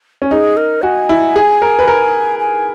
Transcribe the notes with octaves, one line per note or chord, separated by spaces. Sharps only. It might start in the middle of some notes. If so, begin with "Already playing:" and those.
C#4
D#4 G#4
A#4
F#4 G#5
E4
G#4
A#4
B4
A#4
G#5